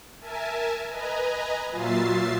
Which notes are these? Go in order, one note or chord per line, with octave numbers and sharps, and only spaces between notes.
A#4 E5 G#5 A5
B4 D#5 G#5 A#5
A#2 F#3 F4 E5 A6 C7